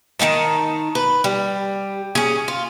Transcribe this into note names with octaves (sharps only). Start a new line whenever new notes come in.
D#3 C#4 D#4 A5
B4
G3
C#4 G#4
F4